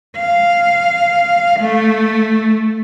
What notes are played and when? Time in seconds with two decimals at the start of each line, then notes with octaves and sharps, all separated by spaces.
0.16 F5
1.60 A3